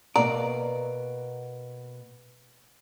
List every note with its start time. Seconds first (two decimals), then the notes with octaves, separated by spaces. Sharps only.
0.16 B2 A#3 B3 D5 A#5